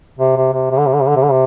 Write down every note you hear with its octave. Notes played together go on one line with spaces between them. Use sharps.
C3
C3
C3
C3
D3
C3
D3
C3
D3
C3
D3
C3